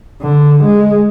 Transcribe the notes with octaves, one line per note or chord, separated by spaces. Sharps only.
D3
G#3